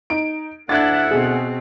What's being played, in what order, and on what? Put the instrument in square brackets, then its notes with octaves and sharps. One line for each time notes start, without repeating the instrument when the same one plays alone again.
[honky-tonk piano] D#4 D7
[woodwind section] D2 A4 F#5 [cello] D4 E4 [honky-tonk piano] F#6 G#6 A6
[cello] B2 C4 [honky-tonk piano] G#4